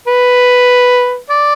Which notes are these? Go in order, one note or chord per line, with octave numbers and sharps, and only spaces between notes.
B4
D5